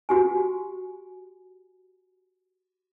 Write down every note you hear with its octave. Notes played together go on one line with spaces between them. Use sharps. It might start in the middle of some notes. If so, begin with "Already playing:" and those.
F#4 G4 G#5